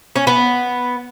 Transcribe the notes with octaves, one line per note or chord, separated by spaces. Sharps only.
C#4
B3